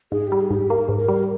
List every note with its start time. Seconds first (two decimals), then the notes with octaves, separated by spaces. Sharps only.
0.12 G#2 G#4
0.27 G3 G4
0.40 G#4
0.51 G#2 G4
0.70 A#3 A#4
0.89 G#2
0.98 A#4
1.08 G3